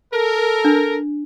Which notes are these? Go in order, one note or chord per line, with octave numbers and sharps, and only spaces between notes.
A4 A#4
D4